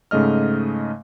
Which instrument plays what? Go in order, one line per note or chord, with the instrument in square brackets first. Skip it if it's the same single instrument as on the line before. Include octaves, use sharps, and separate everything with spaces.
[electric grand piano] G#2 C#3 A3 D#5 F6